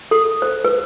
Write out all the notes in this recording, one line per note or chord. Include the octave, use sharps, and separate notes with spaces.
A4
C5
B4